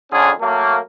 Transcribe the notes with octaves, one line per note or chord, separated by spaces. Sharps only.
F2 D3 C#4 G#4
F#3 A3 A#3